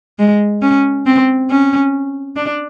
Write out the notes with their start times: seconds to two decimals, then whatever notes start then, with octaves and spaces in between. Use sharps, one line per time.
0.19 G#3
0.62 C#4
1.06 C4
1.50 C#4
2.36 D4